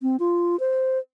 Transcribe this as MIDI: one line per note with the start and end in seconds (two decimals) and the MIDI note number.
0.02 0.17 60
0.20 0.59 65
0.60 0.98 72